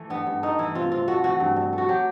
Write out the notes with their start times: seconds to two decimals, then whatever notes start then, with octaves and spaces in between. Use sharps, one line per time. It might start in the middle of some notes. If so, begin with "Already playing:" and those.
Already playing: E3 A3
0.10 G2 B3
0.27 G2
0.43 A3 D#4
0.59 E3 E4
0.75 C3 F4
0.91 C3 F4
1.08 A3 F#4
1.24 E3 F#4
1.40 G2
1.56 G2
1.73 A3
1.78 F#4
1.88 F#3 G4